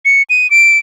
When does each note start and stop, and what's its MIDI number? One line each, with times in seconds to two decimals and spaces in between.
0.05 0.23 97
0.30 0.50 99
0.51 0.78 98